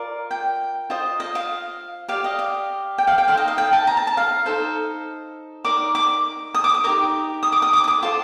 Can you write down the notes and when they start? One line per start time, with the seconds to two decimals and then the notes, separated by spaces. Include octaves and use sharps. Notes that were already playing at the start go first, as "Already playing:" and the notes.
Already playing: F4 A#4 D5
0.31 G5
0.90 F4 C5 D#5
1.20 D#5
1.35 F5
2.08 G4 D5 F5
2.24 D#5
2.39 F5
2.98 G5
3.07 F5
3.18 G5
3.27 D#4 A4 C5 F5
3.37 D#5
3.48 F5
3.58 G5
3.73 A5
3.87 A#5
3.97 A5
4.07 A5
4.17 F5
4.46 D#4 A4 C5
5.65 D#4 A#4 D5 D6
5.95 D6
6.54 D#6
6.64 D6
6.74 D#6
6.84 D#4 G4 A#4 D6
7.43 D#6
7.52 D6
7.62 D#6
7.73 D6
7.84 D#6
7.88 D6
8.03 F4 A4 C5 C6